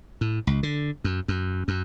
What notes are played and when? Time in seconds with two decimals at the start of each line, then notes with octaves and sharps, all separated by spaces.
0.21 A2
0.47 C#2
0.63 D3
1.04 F#2
1.28 F#2
1.68 F#2